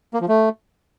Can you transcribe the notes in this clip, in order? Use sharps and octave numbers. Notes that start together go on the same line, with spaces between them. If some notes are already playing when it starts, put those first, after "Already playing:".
A#3
F3
A3